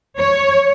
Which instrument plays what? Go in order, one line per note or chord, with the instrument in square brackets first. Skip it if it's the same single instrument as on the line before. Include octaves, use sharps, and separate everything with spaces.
[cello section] C#5